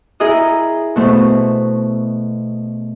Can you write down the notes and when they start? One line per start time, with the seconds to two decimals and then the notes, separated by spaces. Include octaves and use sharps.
0.20 E4 G#4 A#4 D#5 D#6
0.96 B2 A3 C5